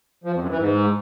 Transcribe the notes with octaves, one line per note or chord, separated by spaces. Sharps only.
F3
F2
F#2
E3
G#2